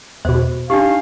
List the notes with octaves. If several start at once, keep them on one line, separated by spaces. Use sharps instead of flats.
E2 B2 C5
D4 D#4 G4 F5